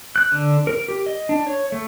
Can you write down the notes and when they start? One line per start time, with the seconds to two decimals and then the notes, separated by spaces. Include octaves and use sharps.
0.16 F#6
0.32 D3
0.67 A#4
0.88 G4
1.06 D#5
1.29 D4
1.47 C#5
1.72 A3